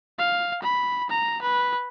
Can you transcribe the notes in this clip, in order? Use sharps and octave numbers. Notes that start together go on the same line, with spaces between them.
F5
B5
A#5
B4